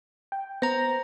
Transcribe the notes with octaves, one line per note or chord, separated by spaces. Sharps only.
G5
B3 C5 A#5 A#6